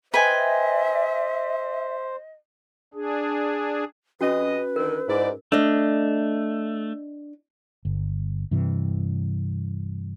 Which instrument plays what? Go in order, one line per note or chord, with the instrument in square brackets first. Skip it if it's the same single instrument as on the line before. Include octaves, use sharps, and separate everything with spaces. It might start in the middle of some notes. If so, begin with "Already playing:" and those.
[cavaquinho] B4 G5 G#5 [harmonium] C5 [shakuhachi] D#5 [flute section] E5
[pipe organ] D4 G#4
[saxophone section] F2 G#4 D#5 [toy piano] C#4 F#4 [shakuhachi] B4
[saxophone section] D3 D#3 [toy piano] A#4
[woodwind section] G#2 [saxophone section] E4 D5
[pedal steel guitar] A3 [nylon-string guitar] D4 D#5
[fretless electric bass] G1
G2 C3 E3